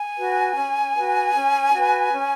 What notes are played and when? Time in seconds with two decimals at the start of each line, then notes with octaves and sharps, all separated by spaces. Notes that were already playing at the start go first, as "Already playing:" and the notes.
Already playing: G#5
0.17 F#4 B4
0.56 C#4
0.95 F#4 B4
1.34 C#4
1.74 F#4 B4
2.12 C#4